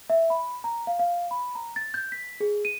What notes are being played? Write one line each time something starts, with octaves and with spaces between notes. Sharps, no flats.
E5
B5
A#5
F5
F5
B5
A#5
A6
G6
B6
G#4
D#7